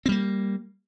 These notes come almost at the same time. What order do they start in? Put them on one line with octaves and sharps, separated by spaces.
C4 G3 A#3